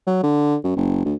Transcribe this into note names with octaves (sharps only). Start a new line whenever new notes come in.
F#3
D3
F#2
F#1
D2